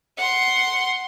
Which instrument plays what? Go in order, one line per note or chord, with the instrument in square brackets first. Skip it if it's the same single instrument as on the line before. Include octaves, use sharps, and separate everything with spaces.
[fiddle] F#5 C6